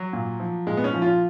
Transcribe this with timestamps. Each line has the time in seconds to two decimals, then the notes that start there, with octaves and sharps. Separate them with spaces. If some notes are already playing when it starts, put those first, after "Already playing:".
Already playing: F#3
0.13 A#2
0.40 F3
0.67 A#2 G#3
0.77 B3
0.84 C#4
0.93 F3
1.02 F4